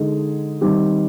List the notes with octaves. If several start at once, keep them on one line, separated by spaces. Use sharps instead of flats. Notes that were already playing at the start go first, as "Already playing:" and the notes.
Already playing: D3 G#3 D#4 G#4
D#3 G3 C4 G4